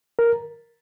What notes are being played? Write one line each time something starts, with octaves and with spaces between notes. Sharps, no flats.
A#4